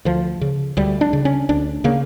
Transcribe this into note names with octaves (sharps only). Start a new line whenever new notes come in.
D2 F3
C#3
D2 G3
D4
C#3
C#4
D2 D4
C#3 A#3